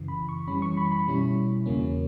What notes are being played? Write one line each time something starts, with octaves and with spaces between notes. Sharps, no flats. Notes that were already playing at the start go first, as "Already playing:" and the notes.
Already playing: F#2 C#3 E3
B5
C#6
F#2 E3 G3 C#4 B5
C#6
B5
B5
B2 G3 C#4 E4
E2 C#3 F#3 A#3 C#4